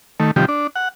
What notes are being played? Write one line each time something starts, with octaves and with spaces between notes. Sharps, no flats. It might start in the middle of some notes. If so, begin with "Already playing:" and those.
D#3 A3
C3 D#3 F3 G3 G4
D4
F#5